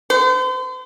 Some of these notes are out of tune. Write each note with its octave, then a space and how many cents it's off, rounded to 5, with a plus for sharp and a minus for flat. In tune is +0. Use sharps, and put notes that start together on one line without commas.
C5 -40